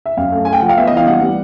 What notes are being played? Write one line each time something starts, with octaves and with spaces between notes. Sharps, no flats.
E5
F#2 F5
A3
A3 G#5
G5
F3 F#5
F5
B3 E5
D#5
E3 F5
G3 F#5
G3